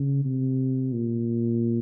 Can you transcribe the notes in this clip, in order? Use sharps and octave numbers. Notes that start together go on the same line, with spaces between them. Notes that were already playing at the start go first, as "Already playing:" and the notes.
Already playing: C#3
C3
A#2